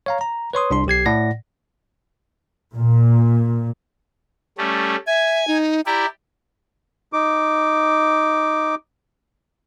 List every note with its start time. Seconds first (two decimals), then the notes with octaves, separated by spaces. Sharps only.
0.06 C#5 F5 A#5
0.21 A#5
0.53 B4 C#5 C6 D#6
0.71 C2 D4 C6
0.87 B1 G4 G#6 C7
1.06 A2 D5 F#5 A#6
2.75 A#2
4.58 G3 A3 C#4
5.07 E5 G#5 G#6
5.48 D#4
5.86 E4 G4 D5 A#5
7.13 D#4 D6